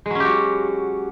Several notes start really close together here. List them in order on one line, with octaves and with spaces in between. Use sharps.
G#3 F#3 C#4 G4 F#4